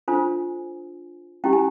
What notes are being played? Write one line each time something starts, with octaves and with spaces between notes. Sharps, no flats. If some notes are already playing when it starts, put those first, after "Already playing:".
D4 F4 A4 C5 G#5
C#4 E4 G4 G5
G#5